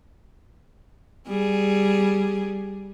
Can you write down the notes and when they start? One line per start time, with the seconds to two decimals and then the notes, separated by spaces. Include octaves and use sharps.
1.28 G3 G#4